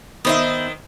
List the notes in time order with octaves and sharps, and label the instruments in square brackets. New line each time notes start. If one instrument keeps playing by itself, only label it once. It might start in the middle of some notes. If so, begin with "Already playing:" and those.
[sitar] D#3 C5 [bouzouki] B3 D#4 E5